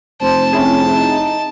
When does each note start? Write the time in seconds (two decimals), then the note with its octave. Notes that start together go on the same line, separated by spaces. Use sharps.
0.22 F1 C5 A5
0.53 C4 C#4 E4 G#4
0.97 D#4